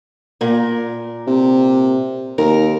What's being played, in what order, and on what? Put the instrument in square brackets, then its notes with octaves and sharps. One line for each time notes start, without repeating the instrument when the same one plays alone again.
[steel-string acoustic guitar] A#2 A#4
[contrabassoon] C3
[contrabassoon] D#2 [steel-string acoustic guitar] A#4